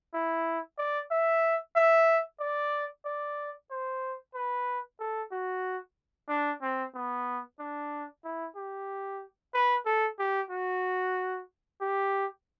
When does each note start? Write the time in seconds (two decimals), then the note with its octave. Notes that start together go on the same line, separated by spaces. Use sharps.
0.14 E4
0.78 D5
1.11 E5
1.76 E5
2.40 D5
3.06 D5
3.71 C5
4.35 B4
5.00 A4
5.32 F#4
6.29 D4
6.62 C4
6.95 B3
7.60 D4
8.25 E4
8.56 G4
9.54 B4
9.86 A4
10.19 G4
10.51 F#4
11.81 G4